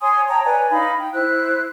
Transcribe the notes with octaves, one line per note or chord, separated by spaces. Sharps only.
C#5 G#5 C6 D#6
C#5 G5 A5 A#5
B4 C#5 D5 G#5
D#4 F5 B5
G5
E4 C5 F#6